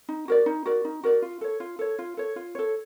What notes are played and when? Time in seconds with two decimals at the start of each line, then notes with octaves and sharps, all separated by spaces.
0.09 D#4
0.28 F#4 A#4 D5
0.46 D#4
0.66 F#4 A#4 D5
0.85 D#4
1.03 F#4 A#4 D5
1.22 F4
1.41 A4 C#5
1.60 F4
1.79 A4 C#5
1.99 F4
2.17 A4 C#5
2.36 F4
2.55 A4 C#5